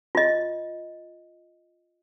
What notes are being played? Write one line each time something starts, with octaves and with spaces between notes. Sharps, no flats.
F4 D#5